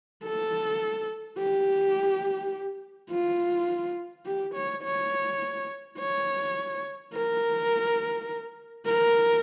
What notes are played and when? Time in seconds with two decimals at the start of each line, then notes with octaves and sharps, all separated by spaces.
0.24 A4
1.38 G4
3.11 F4
4.26 G4
4.54 C#5
4.84 C#5
5.99 C#5
7.14 A#4
8.86 A#4